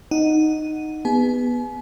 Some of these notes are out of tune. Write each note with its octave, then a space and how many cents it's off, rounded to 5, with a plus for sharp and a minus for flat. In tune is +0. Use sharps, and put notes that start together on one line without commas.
D#4 -5 F#5 +0
B3 +0 G#4 -40 G#5 +45